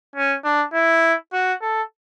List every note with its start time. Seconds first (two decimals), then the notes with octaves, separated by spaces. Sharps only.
0.16 C#4
0.44 D4
0.74 E4
1.33 F#4
1.61 A4